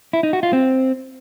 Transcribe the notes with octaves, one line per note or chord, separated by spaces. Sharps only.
E4
D#4
F#4
F4
C4